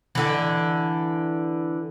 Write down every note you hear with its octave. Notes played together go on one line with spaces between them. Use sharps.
D3 E3